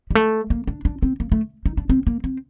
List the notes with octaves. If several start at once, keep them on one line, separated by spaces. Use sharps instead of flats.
G3
A3
A#3
D4
D4
C4
A#3
A3
D#4
D4
C4
A#3
C4